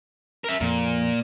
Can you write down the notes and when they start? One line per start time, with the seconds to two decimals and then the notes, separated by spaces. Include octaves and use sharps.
0.44 A#4 E5
0.60 F2 A#2